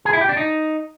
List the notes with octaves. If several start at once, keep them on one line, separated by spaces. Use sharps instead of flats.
G#4
E4
G4
D4
D#4